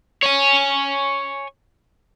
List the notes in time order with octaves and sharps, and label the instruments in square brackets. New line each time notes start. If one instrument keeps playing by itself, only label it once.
[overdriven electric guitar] C#5 G#5